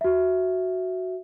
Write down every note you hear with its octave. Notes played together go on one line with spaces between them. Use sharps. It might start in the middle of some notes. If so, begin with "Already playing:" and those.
F#4 E5